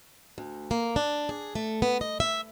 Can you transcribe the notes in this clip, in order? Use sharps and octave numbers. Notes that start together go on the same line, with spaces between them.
D2
A#3
D4
G#4
A3
B3
D#5
E5